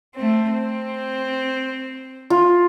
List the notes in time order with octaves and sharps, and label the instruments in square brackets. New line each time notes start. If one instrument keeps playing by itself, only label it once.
[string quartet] A3 C4
C4
[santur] F4